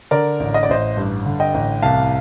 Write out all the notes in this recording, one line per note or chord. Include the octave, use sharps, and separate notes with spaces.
D3 A#4 D5
A1
D#5
D5
A1 C5 D#5
G2
D3
D#5 G5
A1
C2 F5 A5